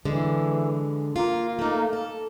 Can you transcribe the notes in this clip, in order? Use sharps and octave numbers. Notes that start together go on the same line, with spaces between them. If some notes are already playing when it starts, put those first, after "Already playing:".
D3 E3 G#3
A#3 F4
A3 D#4
A4